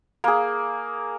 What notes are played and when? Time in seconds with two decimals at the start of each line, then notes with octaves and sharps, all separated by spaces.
0.24 A#3 G#4